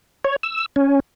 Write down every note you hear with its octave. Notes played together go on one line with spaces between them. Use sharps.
C#5
E6
C#4